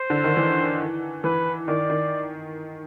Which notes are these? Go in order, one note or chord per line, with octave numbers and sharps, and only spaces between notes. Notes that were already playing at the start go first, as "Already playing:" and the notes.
Already playing: C5
D3
D#3
E3
E3 B4
D#3 D5
D#3